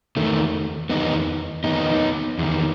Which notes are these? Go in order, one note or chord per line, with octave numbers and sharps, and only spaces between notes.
E2 D#3 A3
E2 D#3 B3 D#4
E2 D#3 B3 D#4
E2 D#3